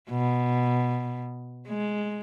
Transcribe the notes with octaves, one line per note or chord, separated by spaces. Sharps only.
B2
G#3